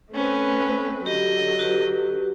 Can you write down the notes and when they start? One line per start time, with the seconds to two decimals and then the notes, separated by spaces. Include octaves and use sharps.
0.14 A3 C4 C#4 B4
1.06 D3 F#3 G4 D#5
1.59 F#4 G4 B4